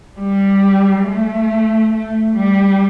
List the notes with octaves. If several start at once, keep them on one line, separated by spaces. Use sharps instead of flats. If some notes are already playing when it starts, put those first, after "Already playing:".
G3
A3
A3
G3